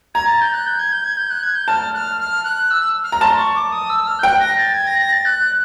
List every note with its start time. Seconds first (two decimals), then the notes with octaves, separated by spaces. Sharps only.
0.15 A#5 G#6
0.28 A6
0.41 G6
0.54 F#6
0.66 G6
0.79 G#6
0.92 G6
1.04 G#6
1.17 G6
1.30 F#6
1.43 G#6
1.55 G6
1.68 A5 F6
1.94 F#6
1.97 F6
2.20 F6
2.44 F#6
2.71 E6
3.04 F6
3.12 A#5
3.21 A5 C6
3.38 C#6
3.55 D6
3.72 D#6
3.90 E6
4.07 F6
4.19 G6
4.23 G5 F#6
4.40 A#6
4.58 A6
4.74 G#6
4.87 A#6
5.00 A#6
5.12 A6
5.25 F#6